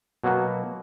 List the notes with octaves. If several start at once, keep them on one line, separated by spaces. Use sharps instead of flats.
B2 F#3 A#3 B3 F#4